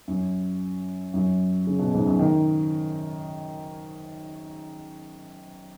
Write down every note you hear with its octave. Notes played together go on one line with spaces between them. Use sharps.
F#2
F#2
C#3
B2
G#2
F#2
D#3